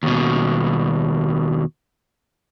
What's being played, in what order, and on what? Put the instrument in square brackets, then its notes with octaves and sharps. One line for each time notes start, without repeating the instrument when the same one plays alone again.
[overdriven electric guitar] D#2 B2